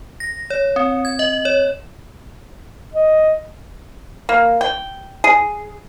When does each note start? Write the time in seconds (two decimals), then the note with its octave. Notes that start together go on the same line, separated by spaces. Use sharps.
0.20 A#6
0.50 C#5
0.76 C4
1.05 G#6
1.19 D#5
1.45 C#5
2.94 D#5
4.29 A#3
4.61 G5
5.24 G#4